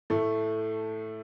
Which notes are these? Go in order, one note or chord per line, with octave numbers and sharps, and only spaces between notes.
A2 A3